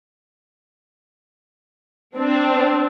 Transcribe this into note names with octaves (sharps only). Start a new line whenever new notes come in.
C4 D4